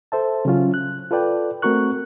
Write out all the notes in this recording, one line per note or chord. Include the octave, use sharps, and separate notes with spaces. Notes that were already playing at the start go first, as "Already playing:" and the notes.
A4 C5 E5 A5
C#3 F#3 C#4 F4
F#6
F4 A4 B4 D5 G5
A3 C4 F#4 A#4 C#6 F#6